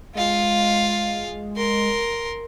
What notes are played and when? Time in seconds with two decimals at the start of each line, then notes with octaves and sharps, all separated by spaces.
0.15 G#3 F4 F5
1.57 A#4 C6